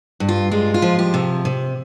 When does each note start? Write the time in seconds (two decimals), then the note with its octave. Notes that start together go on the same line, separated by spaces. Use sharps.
0.20 G2
0.29 F4
0.52 G#3 F4
0.74 F4
0.82 F3
0.99 G4
1.14 C3
1.45 C3